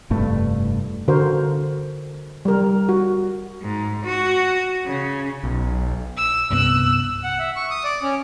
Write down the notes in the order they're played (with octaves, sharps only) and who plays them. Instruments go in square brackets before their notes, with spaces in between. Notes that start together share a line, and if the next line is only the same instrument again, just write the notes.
[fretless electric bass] F1 G2 A3
[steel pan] D3 F#4 A#4 C5
G3 A#4
F#4
[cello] G#2
F#4
C#3
[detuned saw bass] B1
[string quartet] E6
[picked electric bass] C2 G2 B3 [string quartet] E6 F#6
[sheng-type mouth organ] F#5
E5
C#6
D#6
D5
C#4